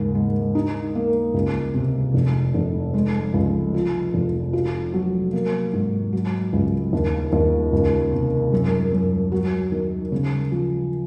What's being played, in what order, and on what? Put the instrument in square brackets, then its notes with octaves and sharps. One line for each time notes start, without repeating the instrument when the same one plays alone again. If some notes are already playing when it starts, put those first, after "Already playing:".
Already playing: [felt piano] D#2 G#2 C#3
G#3
D#4
A#3
C#2
C3
F1
F1
G#3
C#2
F3
F1
F4
F#3
A#3
G#2
F#3
C#2
D#2
D#2
C#2
C3
F#2
F#2
F#3
D#3
C#3
F3